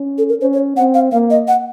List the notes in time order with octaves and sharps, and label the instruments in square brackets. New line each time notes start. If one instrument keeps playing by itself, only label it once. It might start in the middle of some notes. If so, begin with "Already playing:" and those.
Already playing: [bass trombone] C#4
[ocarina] A4
A#4
[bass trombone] C#4 [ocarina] C5
[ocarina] C#5
[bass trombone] C4 [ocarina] F#5
[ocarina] F5
[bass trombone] A#3 [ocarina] F5
[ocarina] D#5
F#5